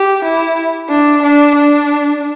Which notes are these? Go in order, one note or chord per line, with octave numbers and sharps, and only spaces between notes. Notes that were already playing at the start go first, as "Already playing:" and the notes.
Already playing: G4
E4
D4
D4
D4